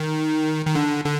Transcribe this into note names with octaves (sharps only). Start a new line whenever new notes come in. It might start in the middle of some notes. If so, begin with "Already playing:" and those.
Already playing: D#3
D#3
D3
D3